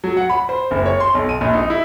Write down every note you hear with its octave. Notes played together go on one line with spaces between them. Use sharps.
F#3
F#5
B5
C5
F#1
C#5
C6
B1
D#7
A#1
D#4
E4